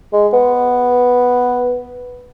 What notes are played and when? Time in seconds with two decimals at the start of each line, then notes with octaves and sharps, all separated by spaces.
0.13 G#3
0.33 B3